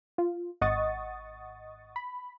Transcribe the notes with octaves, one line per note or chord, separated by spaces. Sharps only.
F4
G#1 D#5 F#5 C#6 D#6 A6
B5